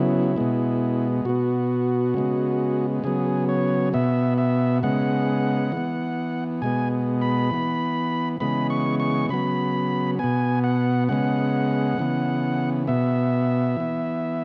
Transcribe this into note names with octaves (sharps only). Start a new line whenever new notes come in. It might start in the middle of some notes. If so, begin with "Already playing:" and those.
Already playing: C#3 F#3 B3 E4
B2 G#3 B3
B2 B3 F#4
C#3 G#3 B3
C#3 F#3 B3 G#4
C#5
B2 B3 E5
E5
C#3 G#3 B3 F#5
E3
B3
B2 G#3 B3 G#5
B5
E3 B3
C#3 E3 G#3 B3 B5
C#6
C#6
C#3 F#3 B3 B5
B2 B3 G#5
F#5
C#3 G#3 B3 F#5
C#3 E3 B3
B2 B3 E5
E3 B3